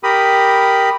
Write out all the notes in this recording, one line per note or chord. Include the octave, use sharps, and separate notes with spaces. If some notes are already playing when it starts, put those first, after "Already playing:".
G4 A#4 B5 D#6